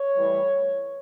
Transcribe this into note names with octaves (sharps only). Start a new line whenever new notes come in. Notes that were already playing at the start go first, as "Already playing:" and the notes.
Already playing: C#5
A2 E3 G3